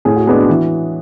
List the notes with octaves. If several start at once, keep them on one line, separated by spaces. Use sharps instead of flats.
A2 G#4
F#4
G#3 B3 D4 G#4
F#4
E3